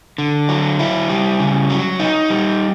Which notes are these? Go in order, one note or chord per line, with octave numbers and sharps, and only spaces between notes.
D3
F#3
E4
G3
C#3
F#3
D#4
G3